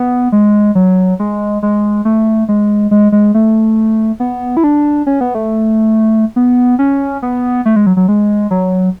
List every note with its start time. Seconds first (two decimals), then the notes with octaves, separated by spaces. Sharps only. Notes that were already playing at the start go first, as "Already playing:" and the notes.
Already playing: B3
0.32 G#3
0.75 F#3
1.20 G#3
1.63 G#3
2.05 A3
2.49 G#3
2.91 G#3
3.12 G#3
3.34 A3
4.20 B3
4.57 E4
4.64 D4
5.07 C#4
5.21 B3
5.35 A3
6.36 B3
6.79 C#4
7.22 B3
7.66 A3
7.76 G#3
7.86 F#3
7.97 F#3
8.08 G#3
8.51 F#3